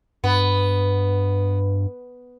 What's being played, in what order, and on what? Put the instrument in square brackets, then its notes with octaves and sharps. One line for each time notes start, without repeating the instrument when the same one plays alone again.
[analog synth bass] G2 [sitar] B3